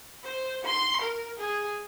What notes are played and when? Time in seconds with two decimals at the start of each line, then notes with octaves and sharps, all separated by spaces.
0.24 C5
0.65 C6
1.01 A#4
1.38 G#4